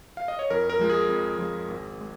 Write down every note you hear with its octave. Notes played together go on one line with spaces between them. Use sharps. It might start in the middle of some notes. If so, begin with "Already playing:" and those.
F5
D#5
C#5
F2 A#4
A#4
F3 G#3
G#4
F2
F3 G#3
G#1
G#3